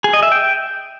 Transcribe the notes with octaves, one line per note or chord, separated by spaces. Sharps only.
G#4
D#5
E5
G5